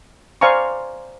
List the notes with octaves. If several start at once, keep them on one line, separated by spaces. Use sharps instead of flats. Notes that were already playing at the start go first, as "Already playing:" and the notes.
C5 D5 F5 G#5 A#5 C#6